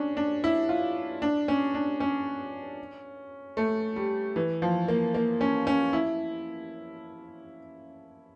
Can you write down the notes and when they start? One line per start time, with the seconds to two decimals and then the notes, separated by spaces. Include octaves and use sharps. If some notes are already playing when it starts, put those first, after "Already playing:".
Already playing: C#4 D4
0.17 D4
0.44 E4
0.69 F4
1.22 D4
1.48 C#4
1.74 D4
2.00 C#4
3.57 A3
3.96 G3
4.36 E3
4.62 F3
4.88 A#3
5.14 A#3
5.41 C#4
5.67 C#4
5.93 E4